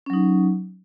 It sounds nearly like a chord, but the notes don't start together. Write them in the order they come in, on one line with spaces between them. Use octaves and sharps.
C#4 F#3 D#4